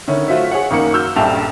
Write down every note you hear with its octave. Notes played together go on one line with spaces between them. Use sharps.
D3 D#3 C#4 E4
A3 F4 F#4 C5 E5
G#4 C#5 F#5
F#1 D#3 A#3 C#7
F#4 E6 F6 G6
D#1 A#1 G2 G5 A5 F7